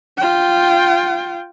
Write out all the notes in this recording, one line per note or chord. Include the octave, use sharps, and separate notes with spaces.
F4 G5